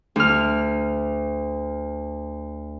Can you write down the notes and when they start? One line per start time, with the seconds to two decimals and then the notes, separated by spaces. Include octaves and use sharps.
0.16 D2 F6